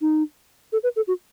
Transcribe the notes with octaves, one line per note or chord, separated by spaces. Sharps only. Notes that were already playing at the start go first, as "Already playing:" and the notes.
D#4
A4
B4
A4
F#4